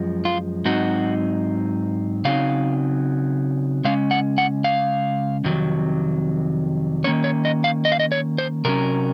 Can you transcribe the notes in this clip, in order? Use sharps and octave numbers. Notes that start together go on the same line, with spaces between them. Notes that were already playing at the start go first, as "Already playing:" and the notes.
Already playing: F#2 F3 G#3
F4
G#2 F#3 C4 D#4 F#4
C#3 F#3 C4 D#4 F5
C#3 G#3 C#4 F5
F#5
F#5
F5
F2 C3 D#3 F#3
D#3 A#3 C#4 C#5
C#5
D#5
F5
D#5
F5
D#5
C#5
C5
C3 F#3 C#4 A#4